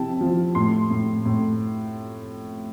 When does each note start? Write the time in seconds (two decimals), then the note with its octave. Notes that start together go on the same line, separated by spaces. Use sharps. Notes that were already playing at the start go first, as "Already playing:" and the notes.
Already playing: C3 F3 E4 G5 A5
0.21 F3
0.55 A2 C6
0.90 A2
1.25 A2